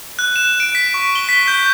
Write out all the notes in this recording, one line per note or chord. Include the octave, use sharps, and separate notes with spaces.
F#6
E7
D7
B6
C#6
G7
B6
G6